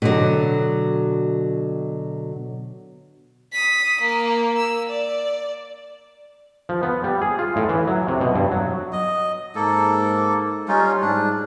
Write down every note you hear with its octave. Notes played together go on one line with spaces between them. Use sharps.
B2 D3 F#3
D#6 B6
A#3
E6
D5
F3
B3
G3
G#4
F4
A2
E3
F#3
C3
B2
G2
F#3
D#5
G#2 A#3 A4
G3 C#4 D#4 F4
G#2 D4